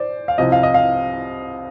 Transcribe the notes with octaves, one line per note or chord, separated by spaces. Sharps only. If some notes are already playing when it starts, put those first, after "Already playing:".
Already playing: C5 D5
F5
C2 C3 F3 D#5
F5
D#5
F5